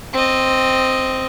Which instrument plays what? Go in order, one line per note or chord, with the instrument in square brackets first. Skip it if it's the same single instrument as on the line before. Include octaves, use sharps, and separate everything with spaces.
[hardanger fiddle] C4 D#5